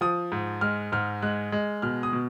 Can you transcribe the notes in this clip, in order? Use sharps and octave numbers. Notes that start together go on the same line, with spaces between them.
F3 D#6
G#2
G#3 F6
G#2 F6
G#3 F#6
G#3
B2 F6
D#6
B2